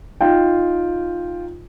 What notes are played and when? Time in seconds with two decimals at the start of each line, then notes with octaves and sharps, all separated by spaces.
0.21 D#4 F4 G5